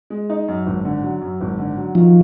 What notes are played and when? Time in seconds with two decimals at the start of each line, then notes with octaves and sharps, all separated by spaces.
0.10 G#3
0.30 D#4
0.48 F#2
0.66 G#1
0.85 D3
1.03 F#3
1.21 F#2
1.41 G#1
1.58 D3
1.77 F#3
1.95 D#3 F3